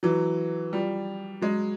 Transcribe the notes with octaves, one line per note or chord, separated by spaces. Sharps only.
E3 F#3
F3 G3
F#3 G#3